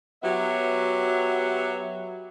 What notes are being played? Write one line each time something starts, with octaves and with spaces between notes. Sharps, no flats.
F#3 B3 G4 E5